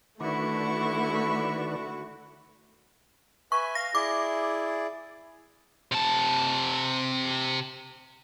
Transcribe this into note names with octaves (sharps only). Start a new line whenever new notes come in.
D3 D#3 A3 E4 F#4 B4 D5 C#6
B4 E5 G#5 C#6
F5 A#6
E4 G#4 D5 D6
C3 A5